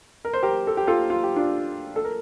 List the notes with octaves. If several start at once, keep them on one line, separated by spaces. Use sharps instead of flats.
A#4
C5
G4 A#4
A4
G4
F4 A4
F4
G4
D4 F4
A4
A#4